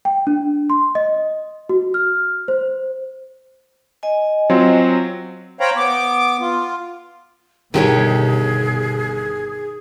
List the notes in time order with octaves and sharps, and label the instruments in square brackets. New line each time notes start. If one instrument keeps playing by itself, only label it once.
[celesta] G5
D4
C6
D#5
F#4
F6
C5
[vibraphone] D#5 G#5
[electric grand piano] F#3 C4 F4
[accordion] C5 C#5 F5 G5 A#5 B5
B3 D6
F4
[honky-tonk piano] G1 [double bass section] B2 [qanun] D#3 G4 C#5 [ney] G#4